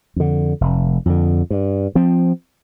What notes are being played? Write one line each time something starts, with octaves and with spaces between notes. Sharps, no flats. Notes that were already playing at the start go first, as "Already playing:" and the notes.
F2 D3
F1
F2 D3
G2
F3 C4